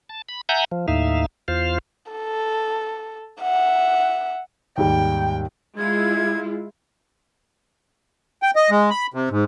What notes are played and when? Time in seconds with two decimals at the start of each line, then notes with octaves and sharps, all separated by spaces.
0.09 A5
0.29 B5
0.49 E5 F#5 G#5 A#5 G6
0.72 F3
0.88 D#2 A2 D#4 E5 F5
1.48 E2 F4 C5 F5
2.12 A4
3.42 E5 F#5
4.78 D#2 G#2 G3 G5
5.78 G#3 E4 F4 G#6
8.42 G5
8.56 D#5
8.70 G#3
8.90 B5
9.14 C3
9.31 G#2